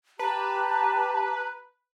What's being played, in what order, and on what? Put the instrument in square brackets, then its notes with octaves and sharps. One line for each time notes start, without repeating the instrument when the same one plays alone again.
[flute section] G4 [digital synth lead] B4 [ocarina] A5 [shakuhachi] A#5